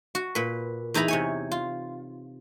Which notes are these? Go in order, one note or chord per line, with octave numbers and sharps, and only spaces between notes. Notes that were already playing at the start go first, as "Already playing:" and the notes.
F#4
A#2 B4
E2 D#4 E4 A#5 B5
C3 C#5 G#5
F4